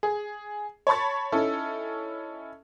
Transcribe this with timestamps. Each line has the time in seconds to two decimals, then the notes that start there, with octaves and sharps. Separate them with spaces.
0.03 G#4
0.87 C#5 A5 B5 C#6 A6
1.32 C#4 D#4 E4 A4